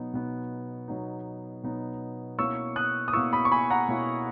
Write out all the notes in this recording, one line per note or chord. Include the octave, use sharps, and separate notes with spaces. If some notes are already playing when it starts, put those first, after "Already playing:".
Already playing: B2 F#3 B3 D#4
B2 F#3 B3 D#4
B2 F#3 B3 D#4
B2 F#3 B3 D#4
B2 A#3 C#4 E4 C#6 E6
D#6 F#6
D#6
B2 A#3 C#4 E4 C#6 E6
B5 D#6
C#6
G#5 B5
F#5 A#5
B2 A#3 C#4 E4